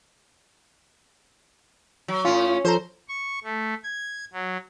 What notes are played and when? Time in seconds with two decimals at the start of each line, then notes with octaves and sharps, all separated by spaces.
2.08 F#3
2.25 A2 C#4 F4
2.65 F3 A4 C5 A#5
3.09 C#6
3.44 A3
3.84 G#6
4.33 F#3